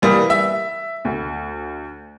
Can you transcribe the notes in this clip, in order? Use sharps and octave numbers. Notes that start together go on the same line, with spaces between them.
E3 G3 A#3 D#6
E5
D2